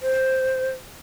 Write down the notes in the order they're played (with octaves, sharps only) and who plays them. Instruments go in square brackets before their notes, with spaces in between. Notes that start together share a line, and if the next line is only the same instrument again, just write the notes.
[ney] C5